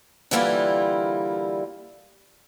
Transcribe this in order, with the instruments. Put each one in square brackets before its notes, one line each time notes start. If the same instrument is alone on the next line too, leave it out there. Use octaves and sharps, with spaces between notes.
[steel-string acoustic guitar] D3 E3 G3 A#3 E4 F4